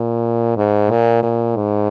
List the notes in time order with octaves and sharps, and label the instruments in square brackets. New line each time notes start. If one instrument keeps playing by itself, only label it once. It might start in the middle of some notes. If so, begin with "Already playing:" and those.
Already playing: [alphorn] A#2
G#2
A#2
A#2
G#2